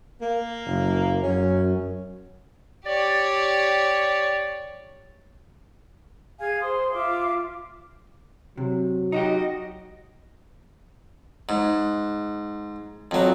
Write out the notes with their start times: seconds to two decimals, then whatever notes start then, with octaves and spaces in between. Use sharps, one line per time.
0.22 A#3
0.66 F#1
1.23 F#2 C#4
2.86 G4 C#5 D5
6.40 G#4 F5 G#5 G#6
6.61 C5 C6 D#6
6.93 F4 E5 D6
8.57 C3 F#3
9.12 D#4 F#4 G4 D#5
11.49 G#2
13.11 F2 F#3